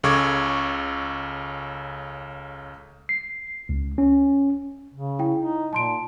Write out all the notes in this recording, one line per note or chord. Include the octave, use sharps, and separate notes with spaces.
C#2 C#3 A4 C#6 D6 G#6
C7
C#2
C#4
C#3
E4 G5
D#4
A#2 A5 C6 D7